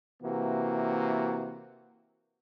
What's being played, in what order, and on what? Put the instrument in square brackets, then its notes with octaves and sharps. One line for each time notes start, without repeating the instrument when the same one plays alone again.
[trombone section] C3 E3 A#3 F#4